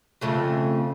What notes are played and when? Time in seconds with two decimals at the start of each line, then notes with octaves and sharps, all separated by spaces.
0.21 F2 C#3 A3